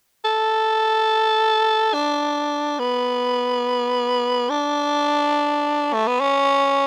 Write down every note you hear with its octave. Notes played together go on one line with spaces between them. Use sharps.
A4
D4
B3
D4
A3
B3
C#4